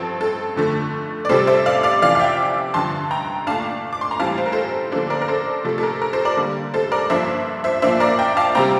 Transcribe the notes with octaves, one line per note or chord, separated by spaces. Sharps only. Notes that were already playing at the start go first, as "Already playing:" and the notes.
Already playing: G2 F3 C4 A4
A4
F2 D3 A3
D5
C3 G3 C4 A4 C5
C5 E5
D5 F5
D5 F5
F2 C3 E3 D5 F5
F5
E5 G5
G2 D3 F3 A5 C6
G5 A#5
A#2 A3 D4 F5 A5
D6
C6
A#5
A2 E3 G3 C4 F5 A5
C5
A#4
A4 C5
D3 F3 A#3 D4 A4 C5
A#4 D5
A#4
A4 C5
C3 F3 A3 A4
A4
A#4
A#4
A4 C5
A#4 D5
D3 G3 A#3
A4 C5
A#4 D5
G2 F3 A#3 D4 C5 E5
C5 E5
A#2 F3 A#3 D4 C5 E5
A#4 D5
E5 G5
F5 A5
C3 G3 C4 G5 A#5